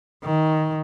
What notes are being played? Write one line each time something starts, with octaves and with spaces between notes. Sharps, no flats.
D#3